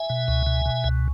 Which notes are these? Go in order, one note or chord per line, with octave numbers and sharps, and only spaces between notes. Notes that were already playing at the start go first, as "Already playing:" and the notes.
Already playing: E5 G#5
B2
C#2
B2
B2
C#2